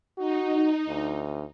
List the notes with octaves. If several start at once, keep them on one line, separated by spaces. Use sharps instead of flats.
D#4 F#4
D2